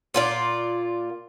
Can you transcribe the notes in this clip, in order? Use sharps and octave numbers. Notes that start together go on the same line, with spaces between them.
A#2 F4 D5